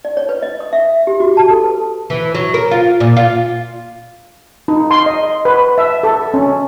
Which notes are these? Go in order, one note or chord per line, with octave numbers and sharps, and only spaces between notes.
D5
C#5
B4
D#5
D#6
E5
G4
F#4
A5
A4
B4
E3
F#3
A#4
F4
A#2
F4
D#4
C6
D#5
B4
E5
A4
C#4